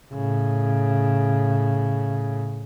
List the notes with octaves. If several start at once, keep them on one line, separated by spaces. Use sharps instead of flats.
A2 C#3